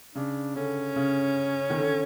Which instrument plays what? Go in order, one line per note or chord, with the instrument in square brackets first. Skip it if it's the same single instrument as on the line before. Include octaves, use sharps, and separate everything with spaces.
[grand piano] C#3 [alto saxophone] D4
[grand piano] D3 [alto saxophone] C#4
[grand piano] C#3
D#3
D3